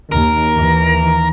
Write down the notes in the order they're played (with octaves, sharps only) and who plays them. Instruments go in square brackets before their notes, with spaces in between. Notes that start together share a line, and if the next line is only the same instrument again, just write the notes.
[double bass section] D#2 [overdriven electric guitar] A#4
[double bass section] D#2 E3